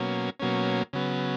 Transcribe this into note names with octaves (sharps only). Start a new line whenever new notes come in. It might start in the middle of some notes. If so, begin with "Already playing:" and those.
Already playing: B2 F#3 A#3 C#4
B2 F#3 A#3 C#4
C#3 F#3 B3